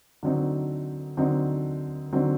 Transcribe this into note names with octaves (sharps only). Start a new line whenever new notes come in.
D3 F#3 C4 D#4
D3 F#3 C4 D#4
D3 F#3 C4 D#4